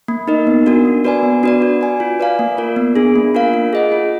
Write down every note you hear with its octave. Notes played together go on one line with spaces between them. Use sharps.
A#3
D#4 A#4 D#5
B3
D4 F#4 A#4
D4
F#4 B4 D5 G#5
B3
D4 F#4 B4 D5
F#4
D5 G#5
F4
B4 D5 F5 G#5
A#3
F4 A#4 D5
B3
D4 G#4
A#3
D4 F4 A#4 F5
F4
G#4 D#5 F#5
F4